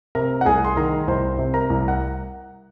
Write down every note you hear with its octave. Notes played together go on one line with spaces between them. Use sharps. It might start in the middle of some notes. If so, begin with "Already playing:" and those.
C3 A#4 A#5
F#5
C2 G#4 G#5
C6
D#3 A#4 A#5
C2 C5 C6
C3
A#4 A#5
C2
F#5